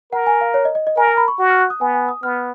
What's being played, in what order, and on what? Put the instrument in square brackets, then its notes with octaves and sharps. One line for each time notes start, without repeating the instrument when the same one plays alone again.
[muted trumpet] A#4 [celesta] F#5
[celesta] G#5
F5
C#5
D#5
D#5
D#5
[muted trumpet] A#4 [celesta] G#5
[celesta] A#5
B5
C#6
[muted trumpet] F#4
[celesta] F6
F#6
D#6
[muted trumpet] B3 [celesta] G#5
[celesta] G#5
D#6
[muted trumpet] B3 [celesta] F6